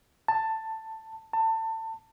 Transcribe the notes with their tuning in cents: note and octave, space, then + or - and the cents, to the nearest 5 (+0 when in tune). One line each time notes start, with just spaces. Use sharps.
A5 +10
A5 +25